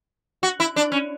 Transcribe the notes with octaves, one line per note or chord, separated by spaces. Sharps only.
F#4
E4
D4
C#4